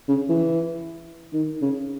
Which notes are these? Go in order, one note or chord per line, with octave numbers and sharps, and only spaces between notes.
C#3
E3
D#3
C#3